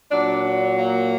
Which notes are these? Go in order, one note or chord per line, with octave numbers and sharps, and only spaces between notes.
A#2 F#3 D4
D4
A#3